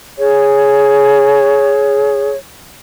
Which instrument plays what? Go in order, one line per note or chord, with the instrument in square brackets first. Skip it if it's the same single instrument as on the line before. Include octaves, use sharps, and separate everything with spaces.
[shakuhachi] G#4 [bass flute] C#5